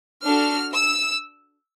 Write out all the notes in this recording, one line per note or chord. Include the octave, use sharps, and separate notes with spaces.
D4 F#4 A4 F6
E6